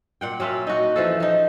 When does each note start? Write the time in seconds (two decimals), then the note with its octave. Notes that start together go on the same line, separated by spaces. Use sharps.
0.21 A#2 F#5 G5
0.40 F#3 C#4 F4 E5
0.67 D#4 F#4
0.96 E3 F3 A4
1.20 F3 D#4